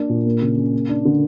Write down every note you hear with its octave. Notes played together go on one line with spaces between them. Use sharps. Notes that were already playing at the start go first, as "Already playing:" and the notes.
Already playing: A#3 D4
A#2
A#3
C#3
C#3
A#3
D4
D3